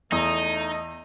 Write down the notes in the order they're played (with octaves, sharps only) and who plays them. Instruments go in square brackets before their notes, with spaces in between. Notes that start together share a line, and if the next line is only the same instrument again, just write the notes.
[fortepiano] E2 [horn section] A3 D#5 [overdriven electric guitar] D#4